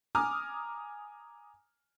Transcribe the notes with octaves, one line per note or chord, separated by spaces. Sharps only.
G#5 A#5 D6 D#6 F6